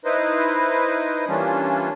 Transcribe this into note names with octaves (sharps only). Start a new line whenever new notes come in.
D#4 E4 B4 C5 D#5
E3 G3 A#3 C#4 D4 F4